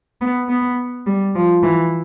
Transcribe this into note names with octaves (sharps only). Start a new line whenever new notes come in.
B3
B3
G3
F3
E3